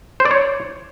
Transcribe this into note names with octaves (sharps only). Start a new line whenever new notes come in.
C5
D5
C#5